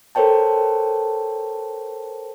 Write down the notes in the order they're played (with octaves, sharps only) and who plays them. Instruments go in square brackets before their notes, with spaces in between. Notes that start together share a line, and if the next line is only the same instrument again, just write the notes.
[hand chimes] A4 A#4 C5 C#5 G5 A5